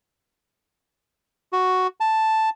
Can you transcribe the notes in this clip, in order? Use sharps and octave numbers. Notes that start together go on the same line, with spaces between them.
F#4
A5